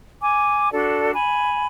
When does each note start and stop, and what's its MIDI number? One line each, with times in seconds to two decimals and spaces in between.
0.21 0.72 80
0.21 0.72 86
0.72 1.12 62
0.72 1.12 66
0.72 1.12 69
0.72 1.12 74
1.14 1.66 80
1.14 1.66 83